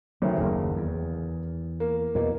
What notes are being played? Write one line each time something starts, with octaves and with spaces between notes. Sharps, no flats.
D2 C3 D#3 F#3
F#1 D#2 G#4 A#4
E2
A#3
E2 B2 A#3